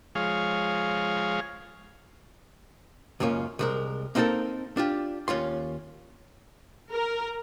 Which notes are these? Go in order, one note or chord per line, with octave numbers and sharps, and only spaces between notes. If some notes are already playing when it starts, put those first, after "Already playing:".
F3 G#3 G#4 C#5 F5
C#2 F#2 A#3 C#4 F4
C2 G#3 A#4
A#3 C4 D#4 G4 A4 A#4
D4 F4 G4
D#2 C#4 F4 C6
A#4